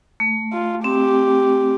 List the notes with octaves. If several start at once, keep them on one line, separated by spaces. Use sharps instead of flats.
A3
F4
C4 G4